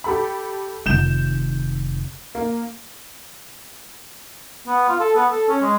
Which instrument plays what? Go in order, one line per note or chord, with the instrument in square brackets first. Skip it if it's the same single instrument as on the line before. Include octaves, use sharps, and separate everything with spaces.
[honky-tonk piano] G4 A4 B5
[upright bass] F1 D#3 [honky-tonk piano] G6 E7
[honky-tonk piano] A#3
[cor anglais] B3
F4
A4
B3
A4
C#4
G#3